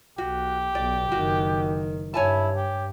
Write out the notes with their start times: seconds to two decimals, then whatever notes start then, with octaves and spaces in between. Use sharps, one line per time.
0.18 B1 F#4 G4
0.75 B1 B2 D5
1.12 F#1 D#3 F#4
2.14 G2 E4 C#5 G#5 A5
2.56 G4